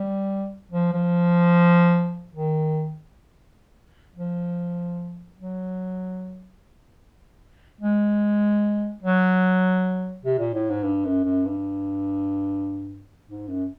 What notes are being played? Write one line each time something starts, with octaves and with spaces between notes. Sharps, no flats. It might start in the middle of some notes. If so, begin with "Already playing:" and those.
Already playing: G3
F3
F3
D#3
F3
F#3
G#3
F#3
C3
A#2
A2
G#2
G2
F#2
F#2
G2
G#2
F#2